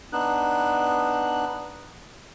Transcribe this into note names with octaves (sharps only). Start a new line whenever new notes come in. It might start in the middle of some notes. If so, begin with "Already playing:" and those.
B3 D4 D#4 F#6